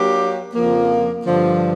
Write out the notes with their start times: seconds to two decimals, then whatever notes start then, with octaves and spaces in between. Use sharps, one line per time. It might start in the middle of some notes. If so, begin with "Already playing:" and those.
Already playing: F#3 A#3 D4 G4
0.55 F2 C#3 F3 A#3
1.25 G2 D3 F3